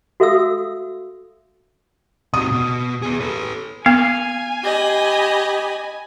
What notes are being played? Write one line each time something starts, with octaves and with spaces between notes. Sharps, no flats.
F#4 A4 E5 F5 D#6 E6
C3 F#4 D#6
B2
B3 G#4
A4 B4
B3 F5 G#5
G4 D#5 B5